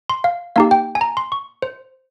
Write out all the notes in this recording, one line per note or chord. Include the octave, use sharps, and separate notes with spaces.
C6
F5
A#3 D#4 G4 F5
G5
G#5
A#5
C6
C#6
C5